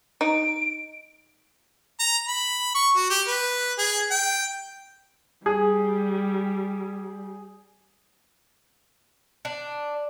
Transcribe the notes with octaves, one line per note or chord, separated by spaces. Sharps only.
D#4 D7
A#5
B5
C#6
F#4
G4
B4
G#4
G5
G3 G#4
D4